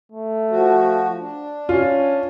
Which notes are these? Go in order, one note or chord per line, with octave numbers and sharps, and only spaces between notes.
A3
F3 F#4
D4
C#4 F4